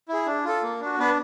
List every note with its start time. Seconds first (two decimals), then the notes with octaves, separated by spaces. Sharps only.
0.08 E4 G#4
0.26 D4
0.45 F4 A4
0.62 A#3
0.81 D4 F#4
0.99 B3 D4 B4